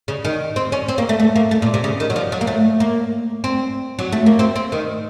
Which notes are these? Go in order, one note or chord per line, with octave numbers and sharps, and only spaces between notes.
C#3
D#3
C4
C#4
C4
A#3
A3
A3
A#3
A3
A#2
C3
C#3
D#3
F#3
F3
F#3
A#3
A3
A#3
C4
F#3
A3
A#3
C4
C4
D#3